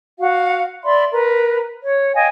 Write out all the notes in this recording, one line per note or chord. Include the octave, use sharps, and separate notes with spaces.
F#4 F5
D5 E5 B5 C6
A#4 B4
C#5
D#5 F5 G5 G#5